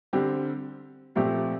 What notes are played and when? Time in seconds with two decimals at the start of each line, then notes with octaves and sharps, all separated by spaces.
0.13 D3 G3 C4 G4
1.15 A#2 F3 A3 C4 G4